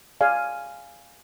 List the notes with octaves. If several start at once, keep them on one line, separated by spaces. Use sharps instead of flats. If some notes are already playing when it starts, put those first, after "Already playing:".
G#4 D5 F5 G#5